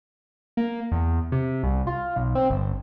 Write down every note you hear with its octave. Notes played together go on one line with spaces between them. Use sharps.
A#3
E2
C3
C2
F4
B1
C4
G1